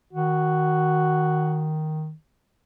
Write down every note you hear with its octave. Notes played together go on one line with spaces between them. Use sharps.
D#3 F#4